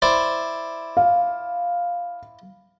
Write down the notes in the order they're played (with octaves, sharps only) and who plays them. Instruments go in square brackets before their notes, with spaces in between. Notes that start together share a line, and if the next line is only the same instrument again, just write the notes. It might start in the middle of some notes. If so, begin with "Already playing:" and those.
[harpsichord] E4 C5 D5
[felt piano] F5